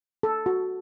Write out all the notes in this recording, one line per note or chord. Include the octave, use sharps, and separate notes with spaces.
A4
F#4